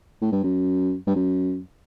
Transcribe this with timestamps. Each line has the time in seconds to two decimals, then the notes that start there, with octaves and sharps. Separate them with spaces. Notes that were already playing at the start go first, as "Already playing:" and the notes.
0.22 A2
0.32 G2
0.44 F#2
1.07 G2
1.16 F#2